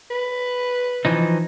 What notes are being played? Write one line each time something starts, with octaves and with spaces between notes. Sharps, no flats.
B4
E3 F3 D#4